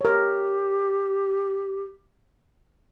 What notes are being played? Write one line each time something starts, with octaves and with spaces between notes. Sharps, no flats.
G4 A#4 C#5